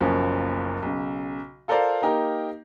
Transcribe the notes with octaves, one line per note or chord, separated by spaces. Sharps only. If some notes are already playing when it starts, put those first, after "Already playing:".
F#1 B1 F3 A#3 C#4
B1 C#3
F4 A4 A#4 C5 D5 F5
A#3 D#4 G4 A#4